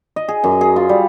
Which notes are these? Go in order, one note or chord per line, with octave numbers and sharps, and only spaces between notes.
D#5
G#4
F#2
G#4
F4
G3